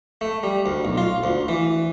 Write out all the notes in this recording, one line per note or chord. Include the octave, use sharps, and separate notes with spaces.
A3
G3
D2
B1
F4
D2
E3